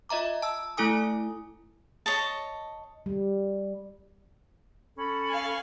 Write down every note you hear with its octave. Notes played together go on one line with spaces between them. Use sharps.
F4 D#5 E5 A#5 D6
A5 E6
A3 E4 A4 G#5 D#6
C#5 D#5 A5
G3
C#4 A4 B5
F5 G#5